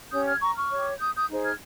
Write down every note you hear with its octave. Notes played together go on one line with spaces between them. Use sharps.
C#4 G4 C#5 D#6 G6
F6 G#6
A#5 C#6
C#6 F6
G4 C#5
D#6 G6
D#6 G6
D#4 G#4 C5
F6 G#6